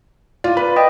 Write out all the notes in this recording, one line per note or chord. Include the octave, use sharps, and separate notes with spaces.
F4 D5
B4
D#5 G5 D#6